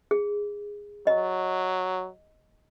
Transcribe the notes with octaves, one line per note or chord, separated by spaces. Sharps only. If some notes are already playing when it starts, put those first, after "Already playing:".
G#4
F#3 D#5